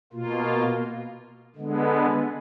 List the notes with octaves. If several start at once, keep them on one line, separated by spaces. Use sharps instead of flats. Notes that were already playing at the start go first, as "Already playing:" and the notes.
B2 A#3 F4
D3 G#3 B3